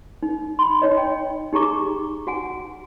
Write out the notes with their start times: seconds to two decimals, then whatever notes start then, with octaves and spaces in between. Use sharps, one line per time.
0.23 D#4
0.59 B5 C6
0.82 D#4 C#5 D#5
0.97 G5
1.53 D#4 G4 G#4 A#5 C#6 D6
2.27 F#4 F#5 G#5